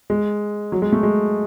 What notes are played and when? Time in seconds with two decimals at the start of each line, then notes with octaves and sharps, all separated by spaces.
0.10 G#3
0.72 F#3
0.82 G#3
0.93 A3
1.03 G#3